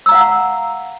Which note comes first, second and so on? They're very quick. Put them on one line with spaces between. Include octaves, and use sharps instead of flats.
E6 A#5 F5 F#5